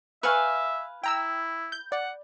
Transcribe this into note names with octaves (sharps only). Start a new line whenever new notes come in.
B4 E5 F5 G#5 C#6 F6
E4 G5 A#5 E6
G6
D5 F#5